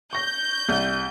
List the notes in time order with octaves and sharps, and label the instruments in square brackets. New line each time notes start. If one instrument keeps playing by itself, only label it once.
[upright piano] C#6 A#6 [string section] G6
[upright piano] C2